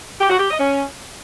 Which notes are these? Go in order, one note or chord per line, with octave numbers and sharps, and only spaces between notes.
G4
F#4
G4
D#5
C#4